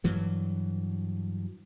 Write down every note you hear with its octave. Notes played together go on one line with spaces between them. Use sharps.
G2 E3 F#3